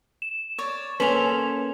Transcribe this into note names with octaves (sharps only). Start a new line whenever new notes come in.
E7
C#5 D5
A#3 C#4 A4 B4 C5 G#5 F7